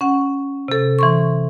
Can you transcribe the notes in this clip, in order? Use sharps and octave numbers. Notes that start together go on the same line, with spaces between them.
C#4 F#5
C3 A4
E3 C6 C#6